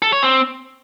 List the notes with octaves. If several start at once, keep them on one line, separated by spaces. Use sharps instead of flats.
A4
C#5
C4